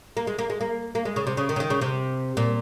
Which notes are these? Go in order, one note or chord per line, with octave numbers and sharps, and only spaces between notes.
A#3
G#3
A#3
G#3
A#3
A#3
G#3
C#3
C3
C#3
D#3
C#3
D#3
C#3
C3
A#2